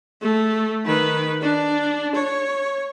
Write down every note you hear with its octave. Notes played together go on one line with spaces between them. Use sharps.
A3
D#3 B4
D4
C#5